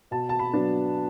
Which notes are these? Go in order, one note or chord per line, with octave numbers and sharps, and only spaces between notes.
B2 A5
A5
B5
F#3 B3 D4